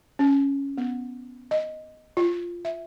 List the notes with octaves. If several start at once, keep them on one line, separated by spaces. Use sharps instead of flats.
C#4
B3
D#5
F4
E5